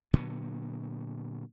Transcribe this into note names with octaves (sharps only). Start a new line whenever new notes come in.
A#2 D3 F#3 B3